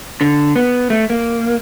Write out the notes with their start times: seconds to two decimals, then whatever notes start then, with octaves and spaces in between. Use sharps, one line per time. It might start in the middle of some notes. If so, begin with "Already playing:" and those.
0.21 D3
0.56 B3
0.90 A3
1.10 A#3